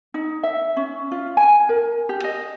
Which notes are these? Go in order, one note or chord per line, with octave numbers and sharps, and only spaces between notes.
D#4
E5
C#4
F4
G#5
A#4
G4
D#5